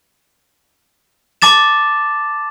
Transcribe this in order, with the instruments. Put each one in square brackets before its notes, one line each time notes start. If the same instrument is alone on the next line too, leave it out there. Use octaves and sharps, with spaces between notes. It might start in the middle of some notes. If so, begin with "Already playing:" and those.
[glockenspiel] A5 D6 A6 E7